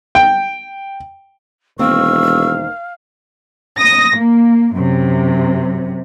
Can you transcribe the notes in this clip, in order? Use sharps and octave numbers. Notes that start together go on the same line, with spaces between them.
G5
E1 D#3 A#3 C4 F5 C#6 E6
D#6 A#6
A#3
F#2 C3